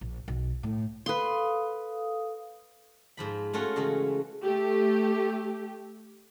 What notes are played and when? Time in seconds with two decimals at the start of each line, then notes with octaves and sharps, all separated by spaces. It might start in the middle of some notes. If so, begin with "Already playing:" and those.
0.01 A#1
0.28 B1
0.63 A2
1.06 A4 B4 F5 C6 D#6
3.17 G#2 F3 B5
3.53 A3 C#4 F4 F#4 C#5
3.76 C#3 E3 G#3 A3
4.43 A3 G4